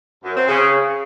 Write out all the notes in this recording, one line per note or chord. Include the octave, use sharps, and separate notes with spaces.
F#2
C4
C#3